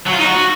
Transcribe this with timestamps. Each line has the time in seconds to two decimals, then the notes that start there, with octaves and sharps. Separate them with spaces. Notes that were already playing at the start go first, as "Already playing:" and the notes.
0.06 F#3
0.12 F4
0.18 D#4
0.24 F#4